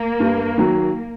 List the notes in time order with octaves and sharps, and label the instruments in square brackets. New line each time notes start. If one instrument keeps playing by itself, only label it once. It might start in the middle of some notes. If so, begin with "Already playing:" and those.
Already playing: [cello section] A#3
[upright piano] G2
D#3 F#3